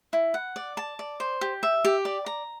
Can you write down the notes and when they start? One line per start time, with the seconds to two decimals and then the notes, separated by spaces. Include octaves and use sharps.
0.13 E4
0.34 F#5
0.56 D5
0.77 A5
0.99 D5
1.20 C5
1.41 G4
1.63 E5
1.85 G4
2.05 D5
2.26 A#5